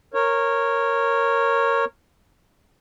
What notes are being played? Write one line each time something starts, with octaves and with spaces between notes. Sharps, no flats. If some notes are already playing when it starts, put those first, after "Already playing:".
A#4 C#5